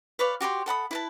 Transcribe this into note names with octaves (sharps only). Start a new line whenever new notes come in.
B4 C#5 D5 F5
F#4 G4 C#5 C6
A4 F#5 B5 D#6
E4 B4 A5